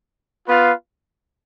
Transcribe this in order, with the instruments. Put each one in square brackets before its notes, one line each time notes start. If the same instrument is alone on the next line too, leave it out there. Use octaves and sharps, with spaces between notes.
[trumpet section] B3 F4 B4 F5